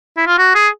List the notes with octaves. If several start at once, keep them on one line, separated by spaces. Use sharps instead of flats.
E4
F4
F#4
G#4